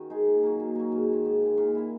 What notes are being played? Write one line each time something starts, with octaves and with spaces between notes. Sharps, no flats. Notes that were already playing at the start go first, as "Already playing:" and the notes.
Already playing: D#3 C#4 F#4
G#3 D#4 G#4
A#2
F#3 A#3
A#2
F#3 A#3
G#2
D#3 G#3
G#2
D#3 G#3
A#2
A#3 E4